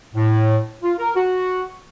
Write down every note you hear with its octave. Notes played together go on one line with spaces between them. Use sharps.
A2
F4
A#4
F#4